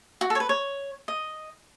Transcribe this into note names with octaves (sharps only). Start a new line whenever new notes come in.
F#4
A4
C#5
B4
C#5
D#5